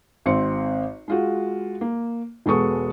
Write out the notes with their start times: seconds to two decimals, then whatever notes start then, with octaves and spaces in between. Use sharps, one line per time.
0.26 G#1 C4 C6 C#7
1.08 G#3 F4 F#4
1.81 A#3
2.46 E1 G#3 B3 A4 C#6 D#6